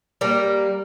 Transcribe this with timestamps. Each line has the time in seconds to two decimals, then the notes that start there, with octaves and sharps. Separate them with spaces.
0.21 G3 A#3